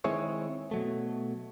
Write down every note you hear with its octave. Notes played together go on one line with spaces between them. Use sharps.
D#3 G#3 C4 E4 G#4 C#5
B2 F#3 A3